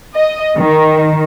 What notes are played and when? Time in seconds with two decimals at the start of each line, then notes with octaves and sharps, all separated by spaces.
0.15 D#5
0.58 D#3